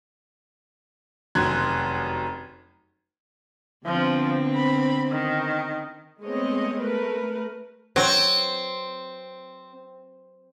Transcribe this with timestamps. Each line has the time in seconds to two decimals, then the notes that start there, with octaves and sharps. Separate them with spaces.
1.35 F1 F#2 D#3 C6 F#6 G#6
3.86 D3 F3 B3 C4
4.55 B5
5.11 D#3
6.23 G#3 A3 B3 C4 C#5 D#5
6.81 A3 A#4 B4
7.96 F#3 C4